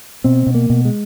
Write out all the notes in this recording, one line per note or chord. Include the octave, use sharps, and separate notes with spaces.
B2 C4
B2
A#3
B2
G#3